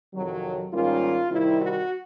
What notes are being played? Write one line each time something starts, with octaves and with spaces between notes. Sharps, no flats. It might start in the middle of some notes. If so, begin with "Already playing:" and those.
F2 C3 D#3 F#3
G#2 D#3 G3 A#3 C#4 F4
C3 D#3 G3 C4 E4
F#4